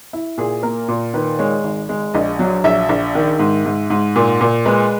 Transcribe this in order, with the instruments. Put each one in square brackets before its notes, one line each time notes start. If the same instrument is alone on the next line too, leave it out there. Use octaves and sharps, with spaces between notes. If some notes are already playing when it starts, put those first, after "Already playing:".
[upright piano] E4
A#2 G#4
A#3 A#4
A#2
D#3 B4
G#3 C#5
G#1
G#3
A#1 D#5
F#3
A#1 E5
A#1
D#3
G#2
G#2
G#2
A#2
A#2
G#3 B4